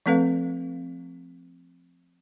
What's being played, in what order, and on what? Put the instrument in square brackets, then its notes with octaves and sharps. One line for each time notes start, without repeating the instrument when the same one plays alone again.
[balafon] F3 A3 C4 A4 B4 F5